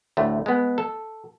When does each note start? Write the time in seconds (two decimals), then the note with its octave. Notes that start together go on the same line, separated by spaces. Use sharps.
0.17 D2 A2 A3
0.46 G#3 B3
0.78 A4